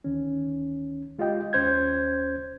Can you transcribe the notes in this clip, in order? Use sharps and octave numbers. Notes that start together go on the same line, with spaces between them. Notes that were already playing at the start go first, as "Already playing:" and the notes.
D2 D#3 C#4
G#3 F4 G4 D#5 G5
D#2 C#4 C5 G6 G#6